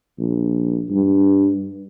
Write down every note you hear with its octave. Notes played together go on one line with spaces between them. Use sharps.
A#1
G2